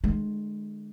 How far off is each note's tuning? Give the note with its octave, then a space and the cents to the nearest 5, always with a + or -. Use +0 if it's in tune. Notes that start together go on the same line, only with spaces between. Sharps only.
D3 +45 G#3 +15